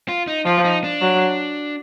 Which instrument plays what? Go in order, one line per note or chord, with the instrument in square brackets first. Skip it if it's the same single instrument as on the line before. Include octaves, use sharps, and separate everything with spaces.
[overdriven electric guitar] F4
D#4
[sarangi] F3 [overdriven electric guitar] F4
[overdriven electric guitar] D#4
D4
[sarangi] F#3